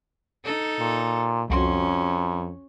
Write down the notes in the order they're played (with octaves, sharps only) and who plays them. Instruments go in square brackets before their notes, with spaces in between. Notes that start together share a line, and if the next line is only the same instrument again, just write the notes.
[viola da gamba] D#4 A4
[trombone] A#2
[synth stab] C2 F#4 C6 [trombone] F2 [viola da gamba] C#4